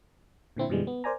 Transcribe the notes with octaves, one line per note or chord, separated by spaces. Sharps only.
A#2 D3 C4 E4
F#2 B2 D3 E3 G3 G#3
B3
A#4 C5 D5 G#5 A#5